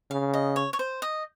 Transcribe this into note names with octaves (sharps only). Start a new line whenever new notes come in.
C#3 F5
D#5
C#5
C#5
C5
D#5